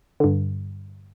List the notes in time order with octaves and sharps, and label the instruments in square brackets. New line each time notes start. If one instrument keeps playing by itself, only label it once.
[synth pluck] G2 D3